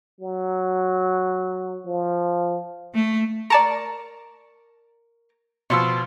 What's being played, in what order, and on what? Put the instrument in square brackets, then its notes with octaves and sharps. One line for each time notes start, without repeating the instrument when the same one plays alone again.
[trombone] F#3
F3
[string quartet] A3
[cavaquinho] A#4 C#6 [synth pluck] D5 A5 A#5
[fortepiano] B2 F3 E6 [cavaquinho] C6 C#6